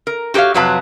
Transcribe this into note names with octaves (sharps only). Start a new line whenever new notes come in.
A#4
F#4 G4 B4 C#5 F5
F2 C3 F#3 B4 F5 A5